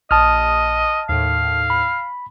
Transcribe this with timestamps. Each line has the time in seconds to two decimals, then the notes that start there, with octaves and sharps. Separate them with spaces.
0.11 A#1 D#5 A5 D#6 F6
1.09 D#2 A2 F5
1.70 B5